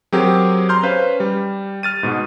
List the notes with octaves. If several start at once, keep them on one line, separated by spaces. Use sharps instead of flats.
F#3 C4 G4 G#4 A#4
A#5 C6 F6 G6
C#4 B4 C5 F5
G3
F6 A6 D#7
G#2 B2